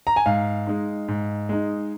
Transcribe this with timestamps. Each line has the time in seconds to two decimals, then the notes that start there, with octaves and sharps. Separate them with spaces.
0.07 A#5
0.16 G#5
0.26 G#2 F5
0.67 G#3 D#4
1.08 G#2
1.49 G#3 D#4